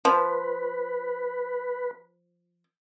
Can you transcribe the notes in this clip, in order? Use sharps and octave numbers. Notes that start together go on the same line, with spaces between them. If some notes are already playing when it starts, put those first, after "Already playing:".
F3 B4